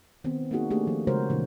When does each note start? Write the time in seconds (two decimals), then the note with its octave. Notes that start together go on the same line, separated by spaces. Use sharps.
0.24 D#3 B3 C4
0.51 A#3 C4 D#4 F#4 G#4
0.70 A3 A#3 D4 G4 G#4
0.87 D#3 F3
1.07 C#3 G#3 F#4 A#4 C5 C#5
1.30 A#2 C#3 E3 D4